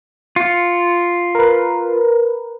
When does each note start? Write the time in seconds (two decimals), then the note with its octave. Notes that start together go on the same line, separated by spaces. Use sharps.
0.36 F4 C#7
1.35 A#4 B4